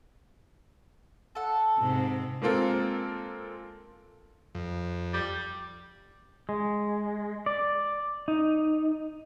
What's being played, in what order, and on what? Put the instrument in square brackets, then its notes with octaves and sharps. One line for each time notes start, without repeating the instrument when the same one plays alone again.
[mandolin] A4 F#5
[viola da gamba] G#2 C3
[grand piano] G#3 A#3 C4 F4 A4 A#4
[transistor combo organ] F2
[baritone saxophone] G3
[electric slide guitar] G#3
D5
D#4